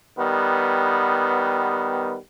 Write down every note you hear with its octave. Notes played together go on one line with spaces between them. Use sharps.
D#3 G3 B3